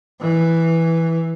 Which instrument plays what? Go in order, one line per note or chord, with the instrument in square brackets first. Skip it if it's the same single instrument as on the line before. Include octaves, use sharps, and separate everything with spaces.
[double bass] E3